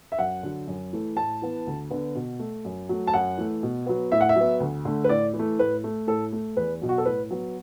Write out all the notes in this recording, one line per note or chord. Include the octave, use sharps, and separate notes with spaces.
E5
F#2 F#5
D3 F#3
F#2
E3 A3
A2 A5
E3 B3
D2
D3 B3
B2
A3
F#2
F#3 A3
A5
F#2 F#5
E3 A3
B2
F#3 B3
A2 E5
F#5
E5
F#3 B3
D2
D3 A3
B4
A2 D5
E3
A3
A2 B4
A3
A2 A4
A3
E2 B4
B2 F#3
F#4
A4
A2 B4
F#3 B3